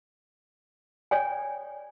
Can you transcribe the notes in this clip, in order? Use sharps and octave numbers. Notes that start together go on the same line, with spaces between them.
C#5 D5 G5 G#5